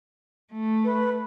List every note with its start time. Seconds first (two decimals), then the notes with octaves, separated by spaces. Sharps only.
0.53 A3
0.84 B4